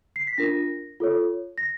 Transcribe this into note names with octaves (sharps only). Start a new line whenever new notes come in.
C7
B6
D4 F4 A#4 A#6
F4 A4 C#5
A#6